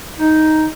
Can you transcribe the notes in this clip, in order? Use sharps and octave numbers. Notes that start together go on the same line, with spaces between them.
D#4